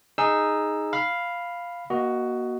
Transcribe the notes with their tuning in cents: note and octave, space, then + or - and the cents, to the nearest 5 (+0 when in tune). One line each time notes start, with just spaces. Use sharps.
D#4 +0 G#4 +0 E6 +10
F5 +0 B5 +0
A#3 +35 F#4 +10 D#5 +5